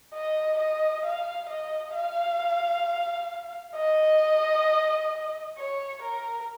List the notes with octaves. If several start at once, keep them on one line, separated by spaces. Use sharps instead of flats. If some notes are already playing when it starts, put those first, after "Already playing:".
D#5
D#5
F5
D#5
F5
D#5
C#5
A#4